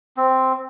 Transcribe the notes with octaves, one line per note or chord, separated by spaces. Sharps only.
C4